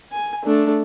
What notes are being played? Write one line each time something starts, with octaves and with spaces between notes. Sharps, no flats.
G#5
A3 D4